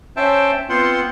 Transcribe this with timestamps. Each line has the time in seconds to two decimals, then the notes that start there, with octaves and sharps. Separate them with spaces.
0.17 C#4 C5 E5 G5 A5
0.69 B3 C4 F4 C5 F#5 C6